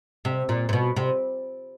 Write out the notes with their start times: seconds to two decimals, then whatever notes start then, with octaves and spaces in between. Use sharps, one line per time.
0.25 C3
0.49 A#2
0.69 A#2
0.73 B2
0.96 C3